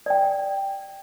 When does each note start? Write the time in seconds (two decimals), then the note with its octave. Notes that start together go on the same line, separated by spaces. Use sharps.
0.06 D5 G5